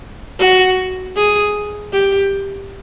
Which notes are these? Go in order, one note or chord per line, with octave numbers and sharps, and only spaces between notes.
F#4
G#4
G4